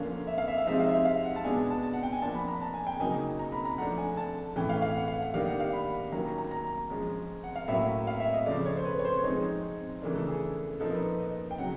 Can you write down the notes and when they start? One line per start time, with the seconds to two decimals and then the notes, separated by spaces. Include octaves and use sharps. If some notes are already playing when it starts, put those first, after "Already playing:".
Already playing: D3 F3 A#3 C#4 F5
0.27 E5
0.38 F5
0.48 E5
0.58 F5
0.67 C3 F3 G#3 C4 D#4 E5
0.79 F5
0.88 E5
1.05 F5
1.25 F#5
1.36 A5
1.44 B2 G#3 B3 D4 G#5
1.57 A5
1.70 A5
1.83 A5
1.93 F#5
2.03 G5
2.12 G#5
2.22 F3 A#3 D4 A5
2.35 B5
2.48 A#5
2.61 A5
2.74 G#5
2.87 G5
3.00 C#3 F#3 A#3 D#4 G#5
3.39 A#5
3.52 B5
3.65 A#5
3.78 F3 A3 D4 F#5
3.98 G#5
4.17 A5
4.56 A2 E3 A3 C#4 G5
4.69 F5
4.82 F5
4.95 F#5
5.08 F5
5.21 F#5
5.34 D#3 G3 A#3 D4 F5
5.46 F#5
5.60 F5
5.73 B5
6.12 D#3 F#3 A#3 C#4 A#5
6.38 A#5
6.51 A#5
6.90 F3 G#3 C#4
7.44 F#5
7.56 F5
7.68 A2 F#3 A#3 C#4 E5
8.07 F5
8.20 E5
8.33 D#5
8.46 C#3 F3 A3 D5
8.66 C#5
8.77 C5
8.85 B4
8.99 C#5
9.05 C5
9.24 F3 G#3 C4 D#4 C#5
10.02 C#3 E3 A3 D4 A#4
10.15 A4
10.28 G#4
10.80 A#2 F3 A#3 D#4 A4
10.88 A#4
10.93 B4
11.20 D#5
11.51 G5
11.58 C#3 F#3 F#5